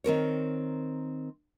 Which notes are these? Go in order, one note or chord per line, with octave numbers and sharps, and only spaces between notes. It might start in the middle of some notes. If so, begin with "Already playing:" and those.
D#3 C4 A#4 C#5